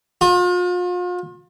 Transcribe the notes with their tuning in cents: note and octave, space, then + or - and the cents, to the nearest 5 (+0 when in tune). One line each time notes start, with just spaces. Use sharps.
F4 +40